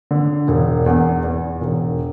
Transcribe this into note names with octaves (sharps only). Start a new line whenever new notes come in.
D3
E1
E2
E2
E1